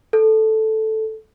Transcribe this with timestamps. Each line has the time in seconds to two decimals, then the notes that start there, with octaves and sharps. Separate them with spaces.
0.13 A4